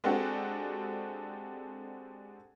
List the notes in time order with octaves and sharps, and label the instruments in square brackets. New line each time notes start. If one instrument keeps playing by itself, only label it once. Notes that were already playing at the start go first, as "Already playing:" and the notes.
[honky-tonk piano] G#3 C4 D4 F#4 G4 A4